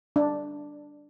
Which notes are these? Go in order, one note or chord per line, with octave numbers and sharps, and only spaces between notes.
D4